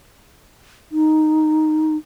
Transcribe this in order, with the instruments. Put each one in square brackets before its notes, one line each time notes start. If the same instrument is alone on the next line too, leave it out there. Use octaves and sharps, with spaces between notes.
[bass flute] D#4